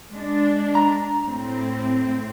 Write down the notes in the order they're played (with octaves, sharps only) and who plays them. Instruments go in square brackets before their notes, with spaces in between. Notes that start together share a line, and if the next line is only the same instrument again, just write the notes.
[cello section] G#3 D4
[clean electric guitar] A#5
[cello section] A2 C4